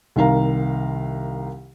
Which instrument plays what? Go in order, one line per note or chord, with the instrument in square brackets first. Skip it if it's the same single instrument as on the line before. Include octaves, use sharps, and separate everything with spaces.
[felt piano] C2 D#3 F5 A#5